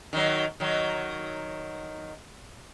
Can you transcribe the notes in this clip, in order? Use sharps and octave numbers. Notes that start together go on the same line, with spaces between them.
D#3 F#3
D#3 F#3